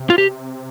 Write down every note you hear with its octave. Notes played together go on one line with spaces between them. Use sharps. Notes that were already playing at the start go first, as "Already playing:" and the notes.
Already playing: C3
F4
G4